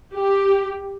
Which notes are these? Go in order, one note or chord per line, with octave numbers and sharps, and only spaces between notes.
G4